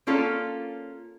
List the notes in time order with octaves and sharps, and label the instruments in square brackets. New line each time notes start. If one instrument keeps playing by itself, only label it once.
[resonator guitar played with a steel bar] A#3 C#4 F4 A4